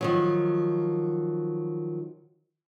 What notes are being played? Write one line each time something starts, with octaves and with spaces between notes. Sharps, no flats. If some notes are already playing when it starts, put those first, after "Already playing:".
D#3 F3 F#3